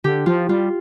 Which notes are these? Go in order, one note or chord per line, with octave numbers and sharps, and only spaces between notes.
D3 G4
F3 F4
G3 F4